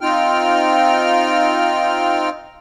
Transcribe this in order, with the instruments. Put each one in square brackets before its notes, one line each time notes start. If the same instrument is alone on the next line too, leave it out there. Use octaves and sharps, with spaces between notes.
[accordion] C4 D#4 F4 G5 F6